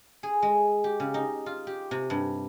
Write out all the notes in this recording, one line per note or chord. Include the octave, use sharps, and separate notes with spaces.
G#4
G#3
G4
C#3
D#4
F4
G4
C3
G2